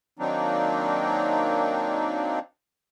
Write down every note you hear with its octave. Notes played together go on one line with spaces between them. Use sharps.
D#3 F#3 A#3 C4 D4 D#4